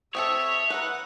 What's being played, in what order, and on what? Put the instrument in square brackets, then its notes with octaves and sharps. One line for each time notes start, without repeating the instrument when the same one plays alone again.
[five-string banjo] C4 G4 A4 [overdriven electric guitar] C#5 [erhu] E5 [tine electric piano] D#6 E6
[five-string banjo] B4 A#5 [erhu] F#5